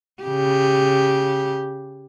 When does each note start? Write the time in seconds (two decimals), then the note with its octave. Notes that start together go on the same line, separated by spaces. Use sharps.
0.23 C#3 G4